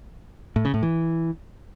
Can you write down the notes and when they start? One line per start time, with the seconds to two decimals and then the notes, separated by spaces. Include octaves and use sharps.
0.56 A2
0.65 C#3
0.74 A2
0.83 E3